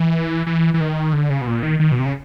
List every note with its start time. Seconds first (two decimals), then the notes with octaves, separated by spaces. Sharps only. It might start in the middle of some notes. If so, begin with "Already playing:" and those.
Already playing: E3
0.47 E3
0.74 E3
0.81 D#3
1.13 D3
1.30 C#3
1.41 B2
1.47 A#2
1.63 D#3
1.80 D#3
1.92 B2
1.99 C3
2.05 C#3